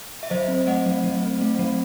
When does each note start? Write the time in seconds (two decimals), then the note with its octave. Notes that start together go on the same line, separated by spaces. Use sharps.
0.23 E5
0.30 F#3 C5 D#5
0.48 C4
0.67 A3 D#5 F#5
0.86 F#3
1.04 F#3
1.23 C4
1.41 A3
1.59 F#3